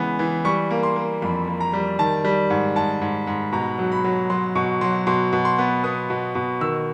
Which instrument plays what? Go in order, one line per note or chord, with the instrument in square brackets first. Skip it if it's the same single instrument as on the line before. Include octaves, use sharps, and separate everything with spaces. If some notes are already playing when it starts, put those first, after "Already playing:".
Already playing: [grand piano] C#3 E3 G#3 B3
E3
G3 C#6
A#3
C6
A#3
F2 B5
A#3
A#5
G3
D#3 A5
G3
G#2
G#2 A5
G#2
G#2
B2 A#5
F#3
B5
F#3
F#3 C6
B2 C#6
F#3 C6
B2 C6
B2
C6
B3
B3 D#6
B2
B2
D#3 E6